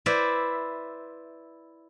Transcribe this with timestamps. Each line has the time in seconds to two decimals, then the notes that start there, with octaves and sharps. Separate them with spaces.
0.06 E4 B4 C5 D5 E5